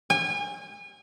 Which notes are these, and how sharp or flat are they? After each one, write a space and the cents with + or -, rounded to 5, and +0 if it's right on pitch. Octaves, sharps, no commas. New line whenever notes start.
G#5 -35